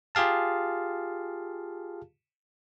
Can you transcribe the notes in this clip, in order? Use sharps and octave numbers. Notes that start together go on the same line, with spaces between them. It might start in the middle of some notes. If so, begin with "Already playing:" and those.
F4 G4 G#4 F5 A5